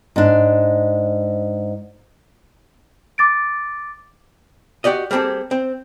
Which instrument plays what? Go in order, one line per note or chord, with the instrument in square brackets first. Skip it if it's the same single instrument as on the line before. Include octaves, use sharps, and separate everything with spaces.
[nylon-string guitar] G#2 D4
[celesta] D6 A6 D7
[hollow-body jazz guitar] F#4 G4 D5 D#5
G3 A#3 C4 G#4 A4
C4